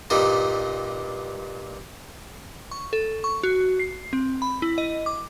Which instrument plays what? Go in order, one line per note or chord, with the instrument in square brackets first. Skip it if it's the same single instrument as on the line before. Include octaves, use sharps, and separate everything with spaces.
[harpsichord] G2 A#2 G3 D#4
[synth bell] C#6
A4
C#6
F#4
C7
C4
B5
E4
D#5
D6